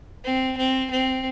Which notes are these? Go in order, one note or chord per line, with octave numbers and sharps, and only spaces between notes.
C4
C4
C4